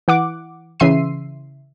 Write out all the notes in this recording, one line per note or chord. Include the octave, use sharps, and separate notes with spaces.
E3 F#5 D6
C#3 E3 E5 C6 C7 D#7